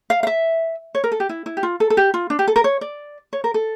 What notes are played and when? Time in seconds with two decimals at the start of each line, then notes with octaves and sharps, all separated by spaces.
0.10 F5
0.23 F5
0.27 E5
0.95 C#5
1.04 A#4
1.12 A4
1.20 G4
1.29 E4
1.46 E4
1.57 G4
1.63 F4
1.80 A4
1.90 A4
1.97 G4
2.14 F4
2.30 D4
2.39 G4
2.48 A4
2.56 A#4
2.64 C#5
2.81 D5
3.33 C#5
3.44 A#4
3.54 A4